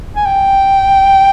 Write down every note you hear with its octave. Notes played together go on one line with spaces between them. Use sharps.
G#5
G5